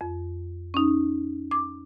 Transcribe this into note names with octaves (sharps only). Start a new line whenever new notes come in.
F2
C#4 D#4
D6